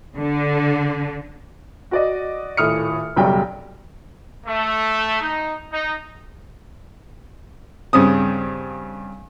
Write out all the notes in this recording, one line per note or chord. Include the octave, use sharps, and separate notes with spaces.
D3
F#4 D5 D#5
D#1 A2 D#6 F6 C#7
F#1 B1 F#3 G3 G5
A3
D#4
D#4
G2 C#3 C4 D#6